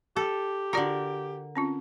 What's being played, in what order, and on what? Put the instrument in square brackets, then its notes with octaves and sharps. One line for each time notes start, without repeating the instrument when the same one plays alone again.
[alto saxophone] G4 [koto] A4
[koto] D3 A#4 [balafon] F4 F#4 D5
[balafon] C4 C#4 F4